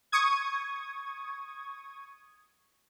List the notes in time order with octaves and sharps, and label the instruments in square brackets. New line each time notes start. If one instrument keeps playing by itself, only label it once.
[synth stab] C#6 D#6 G#6